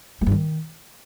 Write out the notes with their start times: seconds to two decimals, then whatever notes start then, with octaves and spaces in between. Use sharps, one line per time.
0.21 G#3
0.26 G2
0.32 D#3